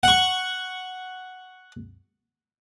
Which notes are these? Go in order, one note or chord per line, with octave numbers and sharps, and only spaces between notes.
F#5 C#6